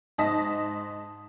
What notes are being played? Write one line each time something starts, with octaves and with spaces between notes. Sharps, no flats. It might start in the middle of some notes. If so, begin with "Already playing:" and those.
G#2 D#5 A5 D#6 A#6 B6